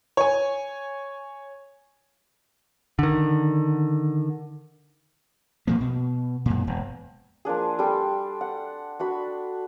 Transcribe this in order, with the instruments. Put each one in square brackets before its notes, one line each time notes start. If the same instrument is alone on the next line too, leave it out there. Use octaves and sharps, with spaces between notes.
[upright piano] C#5 G#5
[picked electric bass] D3 D#3
[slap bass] A#2 F3 A#3
B2
F#2 A#2
E1
[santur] F3 A#3 D4 G#4
G3 A4 G5 C6
F#5
D4 F#4 B5